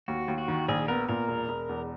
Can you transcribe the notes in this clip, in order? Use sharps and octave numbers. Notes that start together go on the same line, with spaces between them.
D#2 F#4
D#2
F#4
D#3
A#1 G#4
B3 A#4
A#2 A#4
E1
E1
E2